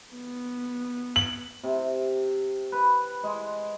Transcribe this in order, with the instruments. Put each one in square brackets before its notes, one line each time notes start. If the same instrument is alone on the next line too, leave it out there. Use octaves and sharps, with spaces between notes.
[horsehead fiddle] B3
[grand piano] F#7
[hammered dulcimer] C3
B4
G#3